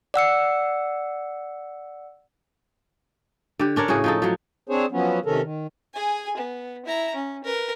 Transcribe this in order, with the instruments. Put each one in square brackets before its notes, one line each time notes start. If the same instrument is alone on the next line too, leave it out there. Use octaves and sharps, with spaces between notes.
[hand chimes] D5 F#5 E6 C#7
[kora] D3 G4
C#4 D4 A#4 C#5
A2 C#3 F#4 G#4
F3 D#4 A4
F3 F#3
[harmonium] C4 D4 G#4 C5 C#5
F3 F#3 B3 C#4
C3 D#3 C#4 A4 A#4
D#3
[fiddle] G#4 G#5
B3
E4 A#5
C#4
A#4 B4